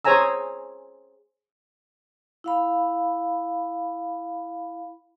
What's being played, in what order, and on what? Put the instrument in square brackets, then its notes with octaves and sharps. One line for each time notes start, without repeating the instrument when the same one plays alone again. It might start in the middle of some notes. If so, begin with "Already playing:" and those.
[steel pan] G#4 C5 C#5 G#5 A#5 E6
[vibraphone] E4 F5 B5